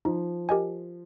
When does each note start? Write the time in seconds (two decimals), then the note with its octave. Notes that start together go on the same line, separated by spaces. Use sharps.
0.05 F3 D#4
0.49 G4 A#4 D#5 G#5